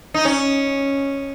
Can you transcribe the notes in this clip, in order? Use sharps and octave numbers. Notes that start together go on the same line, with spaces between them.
D#4
C#4